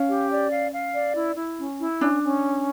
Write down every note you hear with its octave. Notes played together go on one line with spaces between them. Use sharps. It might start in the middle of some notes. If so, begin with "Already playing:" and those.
Already playing: C#4 F5
G4
D5
F5
F5
D5
E4
E4
C#4
E4
C#4 D4
C#4